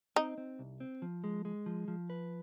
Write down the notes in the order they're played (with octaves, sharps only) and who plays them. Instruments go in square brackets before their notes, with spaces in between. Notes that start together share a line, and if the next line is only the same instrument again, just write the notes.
[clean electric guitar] C4 [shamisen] D#4
[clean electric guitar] C4
C2
C4
F3
G#3
G#3
F3
F3
B4